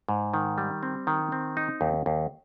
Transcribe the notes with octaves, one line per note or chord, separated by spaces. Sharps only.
G#2
D#3
G3
C4
D#3
C4
D#4
D#2
D#2